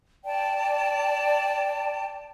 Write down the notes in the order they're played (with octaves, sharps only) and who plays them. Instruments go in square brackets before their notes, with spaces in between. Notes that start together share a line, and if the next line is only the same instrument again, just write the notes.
[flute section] D5 G5 A5